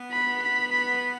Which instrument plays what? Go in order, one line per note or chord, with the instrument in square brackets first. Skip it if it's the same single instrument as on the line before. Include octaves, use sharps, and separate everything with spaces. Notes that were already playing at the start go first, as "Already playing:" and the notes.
Already playing: [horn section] B3
[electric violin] B5
B5
B5